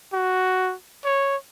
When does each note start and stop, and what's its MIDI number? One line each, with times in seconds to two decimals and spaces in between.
0.13 0.74 66
1.05 1.37 73